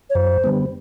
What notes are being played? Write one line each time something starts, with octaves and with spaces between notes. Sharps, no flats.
C#5
F#2 C5
D3 G3 B3